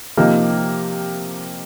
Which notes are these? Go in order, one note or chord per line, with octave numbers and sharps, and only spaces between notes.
C3 F3 A#3 D#4